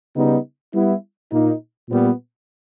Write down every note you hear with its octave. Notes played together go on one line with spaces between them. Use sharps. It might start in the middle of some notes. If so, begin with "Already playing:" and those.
C#3 G3 B3 D#4
G3 B3 E4
A#2 A#3 D#4
A#2 G3 B3